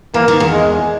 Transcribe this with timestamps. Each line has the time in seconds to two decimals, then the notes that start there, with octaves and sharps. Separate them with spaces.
0.14 E3 A#3
0.28 D#3
0.40 E2
0.52 G#3